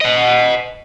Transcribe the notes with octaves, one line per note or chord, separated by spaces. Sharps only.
D#5 F#5